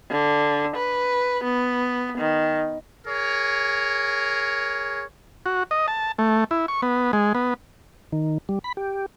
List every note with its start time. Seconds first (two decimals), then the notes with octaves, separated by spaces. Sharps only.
0.10 D3
0.76 B4
1.44 B3
2.18 D#3
3.07 G#4 A#4 C#5
5.46 F#4
5.71 D#5
5.88 A5
6.19 A3
6.51 E4
6.68 C#6
6.82 B3
7.13 G#3
7.35 B3
8.12 D#3
8.49 G3
8.64 B5
8.77 G4